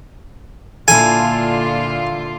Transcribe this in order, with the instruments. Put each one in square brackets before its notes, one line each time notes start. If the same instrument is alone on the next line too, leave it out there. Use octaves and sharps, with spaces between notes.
[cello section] A#2 D3 F4 [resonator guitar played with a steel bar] E4 A4 [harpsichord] G#5